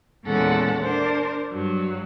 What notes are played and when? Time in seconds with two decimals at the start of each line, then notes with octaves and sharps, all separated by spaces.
0.24 E2 A#2 G#3 C#4 A4 F#5
0.81 D4 A#4 C5
1.53 G2 F#3